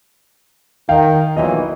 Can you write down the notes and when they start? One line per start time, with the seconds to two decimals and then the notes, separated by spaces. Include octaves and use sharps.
0.89 D#3 F5 G5
1.37 B1 A#2 E3 D#5